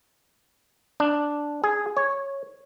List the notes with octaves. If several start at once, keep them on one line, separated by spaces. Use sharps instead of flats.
D4
G#4
C#5